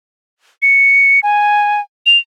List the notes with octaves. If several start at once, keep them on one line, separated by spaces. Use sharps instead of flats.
C#7
G#5
F7